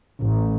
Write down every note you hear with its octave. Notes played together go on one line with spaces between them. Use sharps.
A1